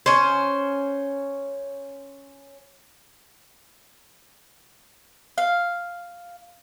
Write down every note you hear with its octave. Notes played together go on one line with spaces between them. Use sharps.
C#4 C5
F5